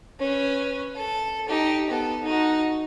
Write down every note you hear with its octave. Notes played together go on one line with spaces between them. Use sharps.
C#4 B4
A4
D#4 G4
B3 A4
D#4 F#4